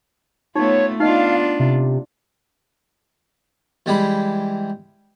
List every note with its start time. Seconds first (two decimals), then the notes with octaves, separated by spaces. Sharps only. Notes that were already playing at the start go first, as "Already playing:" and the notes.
0.55 A3 B3 D#4 F4 C#5
1.00 B3 D4 D#4 F4 D#5 F5
1.59 C3
3.86 E3 G3 G#3 G4 B5